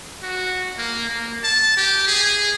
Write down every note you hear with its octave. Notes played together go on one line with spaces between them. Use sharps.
F#4
A#3
A#3
A5
G4
G#4